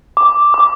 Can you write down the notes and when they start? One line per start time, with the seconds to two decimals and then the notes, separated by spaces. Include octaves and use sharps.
0.17 D6
0.54 D6